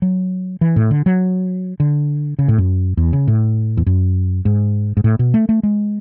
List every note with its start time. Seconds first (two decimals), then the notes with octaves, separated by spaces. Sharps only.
0.02 F#3
0.61 E3
0.76 A2
0.91 D3
1.06 F#3
1.80 D3
2.39 C#3
2.48 A2
2.58 F#2
2.97 E2
3.13 C#3
3.28 A2
3.77 E2
3.86 F#2
4.45 G#2
4.97 G#2
5.04 A2
5.19 B2
5.34 A3
5.49 A3
5.63 G#3